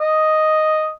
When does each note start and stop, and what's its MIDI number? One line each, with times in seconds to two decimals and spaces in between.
0.01 0.90 75